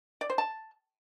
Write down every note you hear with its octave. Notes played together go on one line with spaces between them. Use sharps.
D5
C5
A5